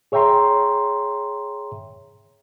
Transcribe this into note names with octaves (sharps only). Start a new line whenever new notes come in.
G#4 C#5 E5 G5 A#5 C6